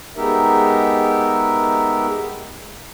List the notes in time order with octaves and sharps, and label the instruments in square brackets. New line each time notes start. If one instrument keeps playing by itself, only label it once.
[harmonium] G#3 B3 D#4 G4 A#4 E5